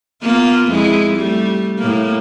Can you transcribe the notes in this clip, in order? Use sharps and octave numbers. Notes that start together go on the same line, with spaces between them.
A#3 B3 F4
F2 G#3 E4
G3 A3
A2 A#3